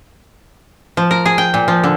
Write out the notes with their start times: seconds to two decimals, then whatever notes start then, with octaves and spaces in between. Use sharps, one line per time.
0.97 F3
1.11 A#4
1.26 G#4
1.38 G5
1.54 A#2
1.68 F3
1.84 D3